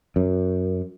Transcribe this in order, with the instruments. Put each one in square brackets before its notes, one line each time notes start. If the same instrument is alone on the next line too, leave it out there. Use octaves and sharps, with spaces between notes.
[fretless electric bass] F#2